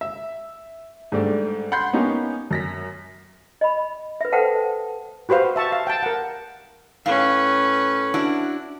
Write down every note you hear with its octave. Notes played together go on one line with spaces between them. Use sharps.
E5
G#2 G3 A3 D4
F#5 B5 C6 G6 C7
A#3 B3 C#4 D#4 G4
F#2 A#6 B6
D#5 B5
B4 E5
A4 B4 C5 F#5 G5 A5
F#4 G4 B4 C5 F5
E5 A5 C#6
F5
G5 A5
A#4 F#5
A2 C#4 B4 F5
D4 E4 F#4